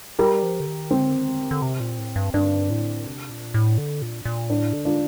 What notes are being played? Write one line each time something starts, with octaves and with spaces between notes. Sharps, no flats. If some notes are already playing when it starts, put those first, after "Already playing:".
G3 G4 A#4
F3
D3
D#3
D3 C4
D#3
D3
D3
C3
A#2
A2
G2
G2 D4
A2
C3
A#2
A2
D3
A#2
A#2
A2 D4
D3
D4 F4